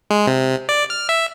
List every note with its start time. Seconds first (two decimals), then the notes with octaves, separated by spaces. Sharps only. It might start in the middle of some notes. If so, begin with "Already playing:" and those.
0.10 G#3
0.27 C3
0.69 D5
0.90 F6
1.09 E5